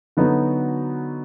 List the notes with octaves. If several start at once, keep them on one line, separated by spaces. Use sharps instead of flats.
D3 F#3 B3 D#4 F#4